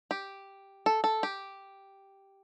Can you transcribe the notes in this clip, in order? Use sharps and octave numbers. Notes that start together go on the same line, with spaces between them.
G4
A4
A4
G4